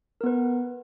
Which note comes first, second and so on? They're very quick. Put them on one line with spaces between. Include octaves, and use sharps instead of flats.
A#4 B3 B4